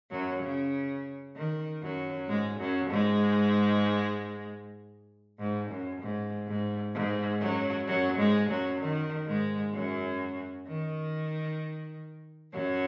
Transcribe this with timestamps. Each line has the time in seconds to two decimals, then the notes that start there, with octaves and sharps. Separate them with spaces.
0.11 F#2 F#3
0.42 C#3
1.36 D#3
1.82 F#2 F#3
2.28 G#2 G#3
2.59 F#2 F#3
2.91 G#2 G#3
5.39 G#2
5.70 F#2
6.01 G#2
6.47 G#2
6.94 G#2
7.40 F#2 F#3
7.87 F#2 F#3
8.18 G#2 G#3
8.49 F#2 F#3
8.80 D#3
9.27 G#2 G#3
9.73 F#2 F#3
10.67 D#3
12.53 F#2 F#3